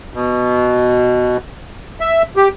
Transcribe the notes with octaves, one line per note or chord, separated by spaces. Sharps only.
B2
E5
G4